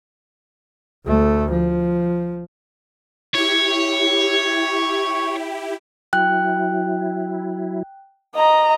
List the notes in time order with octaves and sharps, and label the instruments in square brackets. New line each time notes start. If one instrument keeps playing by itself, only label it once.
[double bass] D2 A3
F3
[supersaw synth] E4 G4 [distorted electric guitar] C#5
[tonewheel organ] F#3 E4 [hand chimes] G5 F#6
[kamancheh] D#5 A#5